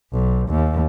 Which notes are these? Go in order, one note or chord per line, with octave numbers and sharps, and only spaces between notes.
B1
D#2